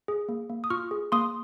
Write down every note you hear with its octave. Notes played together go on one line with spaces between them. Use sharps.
G#4
A#3
A#3
D#6
F4 C#6 F6
G#4
A#3 C6 D#6